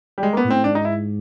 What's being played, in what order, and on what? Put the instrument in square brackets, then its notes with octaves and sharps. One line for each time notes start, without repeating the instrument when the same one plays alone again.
[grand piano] G3
G#3
A#3
B3
[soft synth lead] A2
[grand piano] C4
[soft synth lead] G#2 [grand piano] D4
[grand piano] D#4
E4